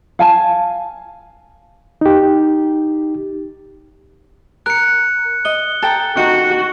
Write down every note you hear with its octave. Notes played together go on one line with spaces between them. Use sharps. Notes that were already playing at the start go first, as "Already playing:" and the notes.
F5 G#5 A5
D#4 G4
A#4 F#6 C#7
D#5 G7
A4 G5 A#5
D#4 F#4 C#7